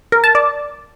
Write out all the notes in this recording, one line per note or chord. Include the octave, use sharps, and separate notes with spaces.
A#4
A5
D5